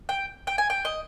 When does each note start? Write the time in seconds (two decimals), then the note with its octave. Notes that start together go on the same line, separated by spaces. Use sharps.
0.09 G5
0.47 G5
0.58 G#5
0.70 G5
0.85 D#5